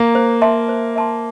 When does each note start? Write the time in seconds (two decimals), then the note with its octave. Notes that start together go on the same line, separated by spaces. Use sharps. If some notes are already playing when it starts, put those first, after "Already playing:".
Already playing: A#3
0.15 C5
0.42 E5 A5 C6
0.69 C5
0.96 E5 A5 C6